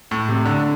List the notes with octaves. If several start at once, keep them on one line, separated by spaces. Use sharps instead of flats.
A2
C3
D3